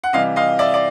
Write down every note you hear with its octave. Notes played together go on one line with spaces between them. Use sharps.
F#5
C3 E3 G3 D#5 F5
D#5 F5
D5 E5
D5